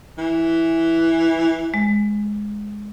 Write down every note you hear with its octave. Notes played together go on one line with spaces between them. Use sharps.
E3
G#3